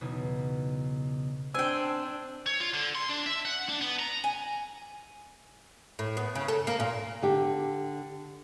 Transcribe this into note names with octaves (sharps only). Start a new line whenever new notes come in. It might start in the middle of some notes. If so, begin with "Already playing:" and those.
B1 E2 C#3
C4 D4 G5 G#5 E6
C#5
F4
D3
C6
D4
E5
F#5
D4
B3
A#5
G#5
A2
B3
C#3
A4
A#3
A#2
D3 G4